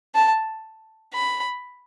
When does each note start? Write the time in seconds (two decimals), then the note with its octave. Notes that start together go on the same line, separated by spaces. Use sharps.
0.15 A5
1.14 B5